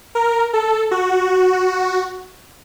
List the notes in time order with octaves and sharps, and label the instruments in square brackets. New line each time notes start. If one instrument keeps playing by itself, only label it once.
[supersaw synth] A#4
A4
F#4